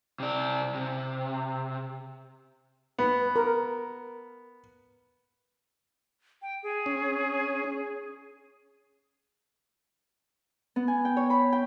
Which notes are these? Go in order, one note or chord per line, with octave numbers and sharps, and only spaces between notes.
C3 D5
C3
B3
A#4
G5
G#4
C#4
B3
G#5
G5
C#5
B5
G5